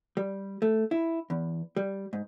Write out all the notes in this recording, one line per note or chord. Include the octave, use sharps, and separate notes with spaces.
G3
A3
E4
E2
G3
G#2